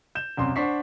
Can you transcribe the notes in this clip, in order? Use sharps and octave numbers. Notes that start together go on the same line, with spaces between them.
G6 E7
C2 F#2 C6
D4 C5 F#5 C#6 B6 C7